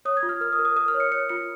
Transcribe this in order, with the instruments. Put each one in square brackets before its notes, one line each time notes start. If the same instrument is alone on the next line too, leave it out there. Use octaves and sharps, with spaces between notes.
[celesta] C#5 D#6
G#6
F4
F6
A#4 F6
D#6
A#4
D#6
A#4 D#6
F6
C#5
C#7
C#5 C#7
F4 C#7